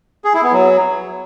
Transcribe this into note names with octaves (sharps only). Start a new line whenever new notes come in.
G#4
E4
B3
F#3